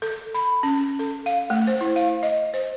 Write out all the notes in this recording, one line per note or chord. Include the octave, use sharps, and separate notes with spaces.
A4
B5
C#4
A4
F5
A3
C5
E4
F5
D#5
C5